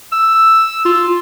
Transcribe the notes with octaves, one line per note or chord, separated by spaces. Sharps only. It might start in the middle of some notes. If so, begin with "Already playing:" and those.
E6
F4